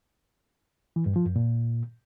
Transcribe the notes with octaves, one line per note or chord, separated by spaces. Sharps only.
E3
G2
F3
F#2
A#2